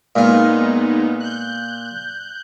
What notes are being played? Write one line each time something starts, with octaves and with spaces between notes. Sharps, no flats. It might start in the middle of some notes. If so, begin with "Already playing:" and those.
A#2 G#3 B3 D#4 F5
F#6 G6